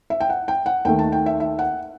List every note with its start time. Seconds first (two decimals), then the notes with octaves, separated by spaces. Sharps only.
0.10 E5
0.20 G5
0.30 F#5
0.48 G5
0.66 F#5
0.85 D#2 D#3 A3 G5
0.99 A5
1.12 G5
1.26 E5
1.40 E5
1.59 F#5